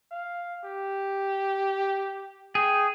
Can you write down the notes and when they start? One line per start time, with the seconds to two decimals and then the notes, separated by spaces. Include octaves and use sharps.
0.12 F5
0.65 G4
2.55 G#4 G5